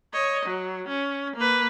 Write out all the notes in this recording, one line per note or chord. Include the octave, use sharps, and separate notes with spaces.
C#5 D#5
F#3
C#4
A#3 B4